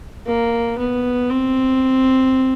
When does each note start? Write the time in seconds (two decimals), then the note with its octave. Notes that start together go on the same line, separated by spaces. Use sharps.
0.26 A#3
0.78 B3
1.30 C4